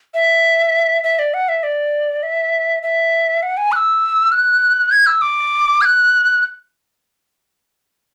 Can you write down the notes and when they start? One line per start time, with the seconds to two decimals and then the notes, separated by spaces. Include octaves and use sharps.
0.14 E5
1.04 E5
1.19 D5
1.34 F#5
1.48 E5
1.63 D5
2.23 E5
2.83 E5
3.42 F#5
3.57 G#5
3.72 F#6
3.76 E6
4.32 F#6
4.91 G#6
5.06 E6
5.21 D6
5.81 G#6
5.85 F#6